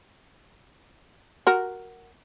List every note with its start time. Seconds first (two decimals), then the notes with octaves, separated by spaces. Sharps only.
1.47 F#4 A#4